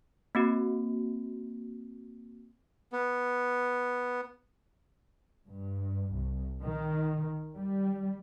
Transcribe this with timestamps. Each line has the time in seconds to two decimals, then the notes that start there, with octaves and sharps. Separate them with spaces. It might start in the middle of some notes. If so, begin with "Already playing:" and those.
0.35 A#3 C4 F#4
2.92 B3
5.48 G2
6.13 C2
6.61 D#3
7.56 G3